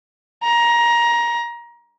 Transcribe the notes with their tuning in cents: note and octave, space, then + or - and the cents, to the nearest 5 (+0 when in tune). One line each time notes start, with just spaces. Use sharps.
A#5 +20